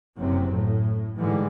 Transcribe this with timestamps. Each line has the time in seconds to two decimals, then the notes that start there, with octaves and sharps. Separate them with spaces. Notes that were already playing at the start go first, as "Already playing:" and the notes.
0.18 F#1 C3 F#3 C4
0.52 A2
1.17 G#2 D3 E3 G3 G#3